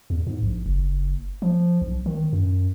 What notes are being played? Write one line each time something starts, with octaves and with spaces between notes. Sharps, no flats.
E2
G#2
A#1
F#1
F3
B1
D#3
F#2